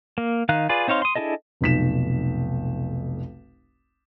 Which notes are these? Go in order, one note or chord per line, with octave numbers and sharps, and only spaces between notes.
A#3
D#3 D#4 F5 F#6
F4 G#4 B4 D5
C4 D#4 C#5 F5 C6
C6 D#6
D4 E4 G#4 A4 D#5
F1 B1 B6 E7